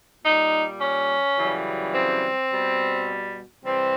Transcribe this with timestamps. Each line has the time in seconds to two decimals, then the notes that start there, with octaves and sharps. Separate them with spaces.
0.24 A#2 G3 D#4
0.80 C#4
1.37 F#2 C#3 E3 G3
1.94 C4
2.52 B2 G3
3.65 C3 E3 G3 C4